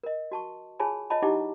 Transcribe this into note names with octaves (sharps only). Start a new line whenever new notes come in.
A#4 D#5
F#4 A5 C#6
F4 G#4 C#5 G#5 A5 B5
F4 C#5 D#5 A5 B5
D#4 E4 G4 D#5 F#5 D6